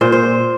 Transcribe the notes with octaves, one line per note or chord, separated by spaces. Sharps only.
A#2 C5
C5